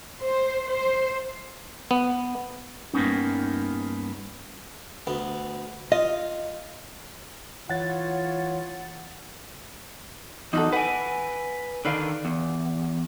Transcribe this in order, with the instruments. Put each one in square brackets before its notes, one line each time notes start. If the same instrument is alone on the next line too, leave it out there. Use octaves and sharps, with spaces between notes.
[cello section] C5
C5
[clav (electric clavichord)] B3
[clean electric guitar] G2 A#3 B3 C#4 D#4
[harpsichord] D2 B3
[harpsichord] F4 [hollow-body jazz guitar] D#5
[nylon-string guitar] E3 [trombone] F4 [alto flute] C#5 [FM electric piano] F#5 A6
[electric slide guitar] E2 [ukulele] D#4 F#4 A4
[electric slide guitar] B4 G#5 [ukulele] F#5
[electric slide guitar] D3 D#3 D4 [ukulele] B4 F5
[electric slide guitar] E2